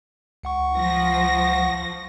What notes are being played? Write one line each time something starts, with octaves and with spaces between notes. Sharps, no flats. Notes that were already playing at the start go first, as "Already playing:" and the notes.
C#2 F#5 C#6
F3 A#6